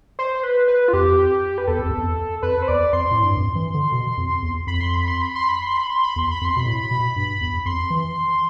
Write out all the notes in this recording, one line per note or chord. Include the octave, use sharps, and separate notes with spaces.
C5
B4
B4
F4
F2 G4
B4
E2 A4
F2
E2
F2 B4
C5
E2 D5
F2 C6
A2
G2
F2
E3
D3
B2
F2
E2
F2 B5
C6
B5
C6
B5
C6
B5
C6
B5
C6
B5
E2 C6
B5
F2
C6
B2 B5
A2
B2
G2
E2
F2 C6
E3